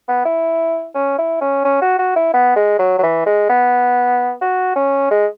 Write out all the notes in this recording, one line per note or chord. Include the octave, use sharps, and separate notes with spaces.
B3
E4
C#4
E4
C#4
C#4
F#4
F#4
E4
B3
G#3
F#3
F#3
E3
G#3
B3
F#4
C#4
G#3